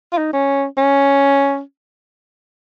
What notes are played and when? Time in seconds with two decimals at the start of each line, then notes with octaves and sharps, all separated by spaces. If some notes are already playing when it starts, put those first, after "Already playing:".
0.13 F4
0.18 D#4
0.33 C#4
0.78 C#4